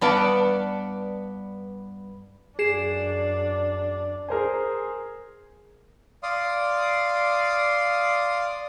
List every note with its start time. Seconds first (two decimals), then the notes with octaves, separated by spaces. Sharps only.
0.01 G2 B3 D5 A5
2.59 F#2 D4 G#4 C7 E7
4.29 G#4 A#4 C5 G#5
6.23 D5 F5 C6 D#6